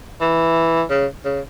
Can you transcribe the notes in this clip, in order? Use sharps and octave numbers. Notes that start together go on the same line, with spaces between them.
E3
C#3
C#3